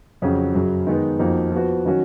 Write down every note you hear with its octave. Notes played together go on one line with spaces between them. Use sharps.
F2 C#3 F#3 C#4 F#4
F#2 C#3 F#3
D#3 G#3 B3 D#4
F2 F3 A#3 D#4 F#4
F3 B3 F#4
D#3 F#3 C#4 F#4